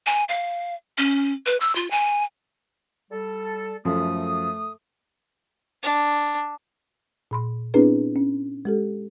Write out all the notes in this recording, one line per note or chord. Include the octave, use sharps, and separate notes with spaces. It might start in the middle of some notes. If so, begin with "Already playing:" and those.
G#5
F5
C#4
B4
E6
F4
G#5
G3 A4
F#2 F3 A3 A4 D#6
D4
A#2 B5 C6
B3 C4 D4 E4 G#4 B4
C#4
G#3 G4 A4